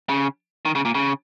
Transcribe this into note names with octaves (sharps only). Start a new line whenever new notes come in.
C#3
D#3
C#3
A#2
C#3